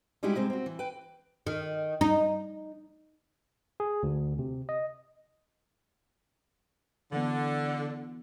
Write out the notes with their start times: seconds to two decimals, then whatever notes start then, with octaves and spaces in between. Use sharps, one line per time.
0.23 G3 G#3 D#4 E4 F#4 G4
0.35 C3 G#3 C4
0.50 C4 F#4
0.66 E3
0.79 B4 G5
1.47 D#3
2.01 D#4
3.80 G#4
4.03 D2
4.39 C3
4.69 D#5
7.13 D3 E3 B3